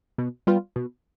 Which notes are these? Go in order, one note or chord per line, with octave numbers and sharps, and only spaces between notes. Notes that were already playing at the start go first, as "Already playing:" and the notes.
B2
G3 B3 F4
B2